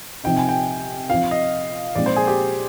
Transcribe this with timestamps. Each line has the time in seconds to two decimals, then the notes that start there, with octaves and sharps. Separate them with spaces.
0.24 C3 F3 C4 D#4 G5
0.37 G#5
0.49 G5
1.10 F3 C4 F4 F5
1.31 D#5
1.95 A#2 F3 G#3 C4 D#4 D5
2.06 C5
2.16 G#4
2.27 G4